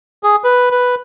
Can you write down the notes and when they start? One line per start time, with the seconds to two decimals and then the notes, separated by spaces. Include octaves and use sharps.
0.23 G#4
0.44 B4
0.71 B4